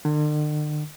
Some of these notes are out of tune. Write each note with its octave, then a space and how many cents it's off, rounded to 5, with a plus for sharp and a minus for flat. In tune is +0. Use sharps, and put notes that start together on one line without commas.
D3 +45